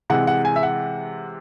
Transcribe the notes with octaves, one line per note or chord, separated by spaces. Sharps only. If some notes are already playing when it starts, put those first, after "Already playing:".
C3 E3 G#3 F#5
F#5
G#5
E5
F#5